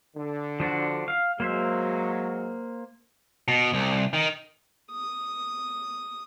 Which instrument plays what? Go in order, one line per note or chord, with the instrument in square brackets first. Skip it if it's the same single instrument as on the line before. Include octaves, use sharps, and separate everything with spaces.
[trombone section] D3
[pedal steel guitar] F3 D4 F#4
F5
[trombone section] F#3 G#3 [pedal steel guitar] A#3 C5 E5
[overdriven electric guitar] B2
C2
D#3
[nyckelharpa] D#6